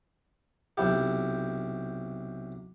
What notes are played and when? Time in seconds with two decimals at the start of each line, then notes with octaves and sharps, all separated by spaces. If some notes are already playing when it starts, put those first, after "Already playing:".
0.77 B1 C3 E4 G4